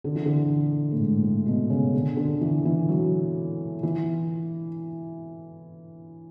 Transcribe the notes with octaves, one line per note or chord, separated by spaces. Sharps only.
D3
E3
D3
A2
G#2
A2
B2
C#3
D3
D3
E3
E3
F#3
E3